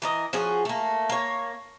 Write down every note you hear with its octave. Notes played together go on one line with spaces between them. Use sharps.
E3 A#4 D#5
F3 C#4 F#4 G#4
A3 A#3
A#3 C#5